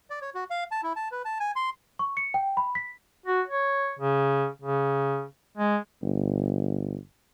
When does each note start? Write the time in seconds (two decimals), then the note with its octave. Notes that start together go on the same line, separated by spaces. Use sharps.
0.10 D5
0.22 C#5
0.35 F#4
0.50 F5
0.71 A5
0.83 E4
0.96 A5
1.12 B4
1.25 A5
1.40 G#5
1.56 C6
1.99 C#6
2.17 C#7
2.34 G5
2.57 B5
2.75 B6
3.26 F#4
3.47 C#5
3.99 C#3
4.62 C#3
5.58 G#3
6.03 G1